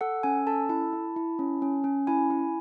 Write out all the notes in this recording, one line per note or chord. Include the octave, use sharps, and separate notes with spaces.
A4 F#5
C#4 G#5
A4 A5
E4 A5
E4
E4
C#4
C#4
C#4
E4 G#5
E4